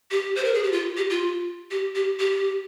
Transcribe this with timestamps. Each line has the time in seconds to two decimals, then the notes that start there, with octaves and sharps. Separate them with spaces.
0.11 G4
0.36 C5
0.45 A#4
0.54 G#4
0.63 G4
0.72 F4
0.97 G4
1.10 F4
1.71 G4
1.95 G4
2.19 G4